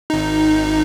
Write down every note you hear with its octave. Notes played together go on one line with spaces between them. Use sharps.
G#1 D#4